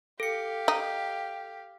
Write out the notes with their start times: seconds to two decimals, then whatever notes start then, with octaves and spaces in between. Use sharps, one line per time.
0.20 G4 A4 F5 C#7
0.68 D#4